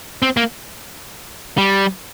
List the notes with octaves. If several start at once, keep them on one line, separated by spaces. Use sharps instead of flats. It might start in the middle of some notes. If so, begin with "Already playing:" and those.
C4
A#3
G3